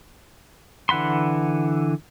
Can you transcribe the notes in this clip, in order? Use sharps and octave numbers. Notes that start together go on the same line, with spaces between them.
D3 E3 F#5 B5 C6